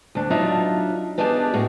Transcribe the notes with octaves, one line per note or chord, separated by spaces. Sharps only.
D2 D4
F#3 D4 D#4 F4 E5 A5
B3 D4 D#4 G4 G#4 A5
A2 F#4 G#4